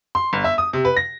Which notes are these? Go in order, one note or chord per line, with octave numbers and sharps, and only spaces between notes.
C6
G1
E5
D#6
C3
B4
A#6